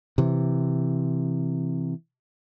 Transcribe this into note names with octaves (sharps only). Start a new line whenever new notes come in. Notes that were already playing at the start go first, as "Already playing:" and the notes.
C3 E3